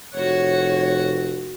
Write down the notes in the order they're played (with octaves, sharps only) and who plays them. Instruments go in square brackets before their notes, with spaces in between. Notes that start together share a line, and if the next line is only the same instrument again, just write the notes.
[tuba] F1 [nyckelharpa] F#4 F#5 [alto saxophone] C#5